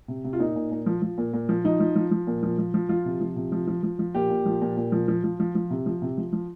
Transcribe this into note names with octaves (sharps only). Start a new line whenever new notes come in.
C3
C3
F4
A#2 D#4
A#2
A#2
F3
F3
A#2
A#2
F3
F3 D#4
F3
F3
F3
A#2
F3
F3
F3
F3 F4
C3
F3
C3
F3
F3
F3
F3
A#2 G4
A#2
F3
A#2
A#2
F3
F3
F3
F3
F3
C3
F3
C3
F3
F3